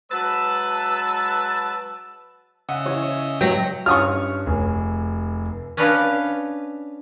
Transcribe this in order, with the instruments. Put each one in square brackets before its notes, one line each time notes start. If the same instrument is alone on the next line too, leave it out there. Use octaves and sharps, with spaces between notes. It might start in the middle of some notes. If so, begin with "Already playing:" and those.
[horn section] F#3 G#3 B4 [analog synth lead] A5 [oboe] E6
[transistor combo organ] C#3 D#5 E5 [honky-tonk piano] F#5
[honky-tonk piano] E3 C#5
[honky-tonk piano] G2 B4 [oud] F#3 [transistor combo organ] C#5 E5 [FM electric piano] G5 A#6
[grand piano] G2 C#4 [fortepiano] C#6 D#6 F6
[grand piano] F1 G#4
[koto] C#4 D4 B4 C#5 D#5 F5